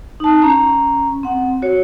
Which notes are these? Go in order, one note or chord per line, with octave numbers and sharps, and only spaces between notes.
D#4 A5
C#4 A#5
C4 F#5
F#4 C#5